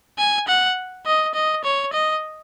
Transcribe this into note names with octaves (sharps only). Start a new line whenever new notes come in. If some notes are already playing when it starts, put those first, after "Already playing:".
G#5
F#5
D#5
D#5
C#5
D#5